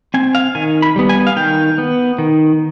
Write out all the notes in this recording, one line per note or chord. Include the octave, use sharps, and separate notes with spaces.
C4 G#5
F5
D#3 G#5
B5
G3 B3
G#5
F5
D#3 G5
B3
D#3